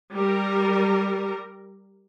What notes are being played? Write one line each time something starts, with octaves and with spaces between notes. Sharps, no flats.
G3 A#4